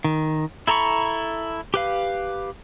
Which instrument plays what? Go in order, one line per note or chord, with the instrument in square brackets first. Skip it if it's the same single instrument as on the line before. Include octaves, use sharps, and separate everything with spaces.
[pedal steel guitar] D#3
E4 A4 A#5 B5 C#6
G4 B4 F5